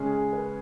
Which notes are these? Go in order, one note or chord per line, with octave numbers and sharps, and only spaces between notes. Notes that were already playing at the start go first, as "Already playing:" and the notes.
Already playing: C#3 G#3 C#4 G#4
G#4
B4